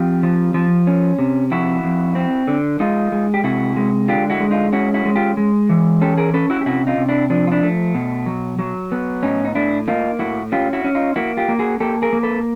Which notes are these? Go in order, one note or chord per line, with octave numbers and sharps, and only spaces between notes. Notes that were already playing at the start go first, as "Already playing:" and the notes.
Already playing: F2 F4 G4
F3
F3
C#4
C3
F2 E4 F#4
F2
C4
D3
G#3 D#4 F4
G#3
G4
C3 E4 F#4
G#3
D3 F4 G4
E4 F#4
G#3
D#4 F4
C#4 E4 F#4
E4 F#4
G#3
F4 G4
G#3
E3
C#4 G4 A4
G#4 A#4
C#4 A4 B4
E4 F#4
G4
C3 E4 F#4
D#4 F4
C3
D4 E4
F3 D4
F4
D4 E4
A3
B2
F#3
F#3
B3
A2 C#4 D#4
D#4
A2 D4 E4
A#3 D#4 F4
A2 E4 F#4
C#4 F4 G4
E4 F#4
C#4
D#4 F4
A#3 E4 F#4
F4 G4
A#3
F#4 G#4
A#3 G4 A4
G#4 A#4
A#3
A4 B4